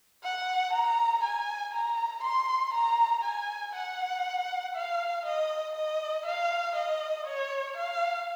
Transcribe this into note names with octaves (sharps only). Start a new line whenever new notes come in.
F#5
A#5
G#5
A#5
C6
A#5
G#5
F#5
F5
D#5
D#5
F5
D#5
C#5
F5